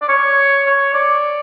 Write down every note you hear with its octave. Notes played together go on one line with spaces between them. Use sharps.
D5
C#5
C#5
D5